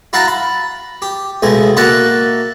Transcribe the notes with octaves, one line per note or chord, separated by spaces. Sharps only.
E4 F#4 F5 A5 A#5
B5
G4
C#2 B2 A3 G#5
A#3 F#4 A#4 E5 F#5 A5